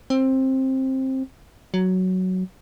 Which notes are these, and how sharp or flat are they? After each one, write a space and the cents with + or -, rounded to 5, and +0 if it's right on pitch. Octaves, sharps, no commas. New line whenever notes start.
C4 +15
F#3 +5